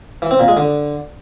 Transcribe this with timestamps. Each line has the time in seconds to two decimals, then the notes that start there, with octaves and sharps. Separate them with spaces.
0.22 E3
0.31 C4
0.40 A#2
0.48 G#3
0.57 D3